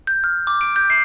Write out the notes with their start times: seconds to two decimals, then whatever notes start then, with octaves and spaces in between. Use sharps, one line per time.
0.07 G6
0.24 F6
0.47 D6
0.61 D7
0.76 G6
0.90 C7